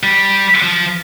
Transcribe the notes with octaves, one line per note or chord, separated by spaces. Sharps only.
G3
F3